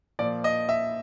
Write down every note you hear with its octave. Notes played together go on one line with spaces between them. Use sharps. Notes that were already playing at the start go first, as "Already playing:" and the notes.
A#2 F3 D5
D#5
E5